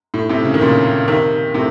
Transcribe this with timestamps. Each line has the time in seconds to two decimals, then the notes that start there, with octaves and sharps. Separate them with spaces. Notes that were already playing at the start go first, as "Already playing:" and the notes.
0.14 A2
0.29 A2 C3
0.45 C#3
0.54 D#3
0.61 A#2 C#3
1.08 C3 D#3
1.54 A2 C3